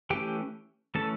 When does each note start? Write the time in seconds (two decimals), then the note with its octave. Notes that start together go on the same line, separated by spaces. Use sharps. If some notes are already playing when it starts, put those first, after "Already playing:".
0.10 E3 A3 C#4 G4 G5
0.95 E3 A3 C#4 A4 A5